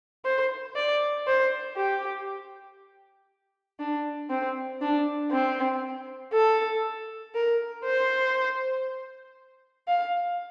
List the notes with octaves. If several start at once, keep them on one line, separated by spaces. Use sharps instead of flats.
C5
D5
C5
G4
D4
C4
D4
C4
A4
A#4
C5
F5